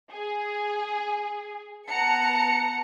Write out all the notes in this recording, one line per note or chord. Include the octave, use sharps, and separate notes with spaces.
G#4
B3 F#5 A5 A#5 C#7